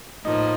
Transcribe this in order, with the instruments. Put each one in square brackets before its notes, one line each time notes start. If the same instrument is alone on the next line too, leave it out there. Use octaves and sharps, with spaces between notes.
[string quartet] A2 F3 A#3 [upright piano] D#4